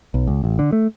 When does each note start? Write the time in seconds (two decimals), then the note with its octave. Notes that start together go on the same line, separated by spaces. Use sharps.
0.14 B1
0.27 C#2
0.44 A1
0.59 D3
0.72 A3